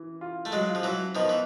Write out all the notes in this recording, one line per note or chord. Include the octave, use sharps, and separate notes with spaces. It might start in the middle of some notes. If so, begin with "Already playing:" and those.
Already playing: E3
F4
A3
F#3 G#3
F4
F3
E3 F#3
D#3 F3 B3
E3